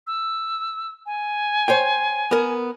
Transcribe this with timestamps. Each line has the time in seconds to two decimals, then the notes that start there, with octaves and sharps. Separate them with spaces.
0.07 E6
1.06 G#5
1.68 C5 C#5 G5
2.31 B3 A#4